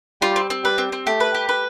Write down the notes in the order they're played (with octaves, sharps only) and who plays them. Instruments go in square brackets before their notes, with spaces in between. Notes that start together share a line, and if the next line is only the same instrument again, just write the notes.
[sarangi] G3 [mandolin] F4
[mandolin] C4
C4
[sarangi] G3 [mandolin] B4
[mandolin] C4
C4
[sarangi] A3 [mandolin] G4
[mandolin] B4
G4
B4